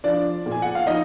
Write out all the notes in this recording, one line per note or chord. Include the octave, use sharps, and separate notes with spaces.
F3 D4 D5
A#2
G#5
F#5
F5
F3 D#4 D#5